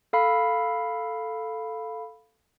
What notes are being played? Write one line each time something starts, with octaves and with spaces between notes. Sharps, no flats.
A4 F5 B5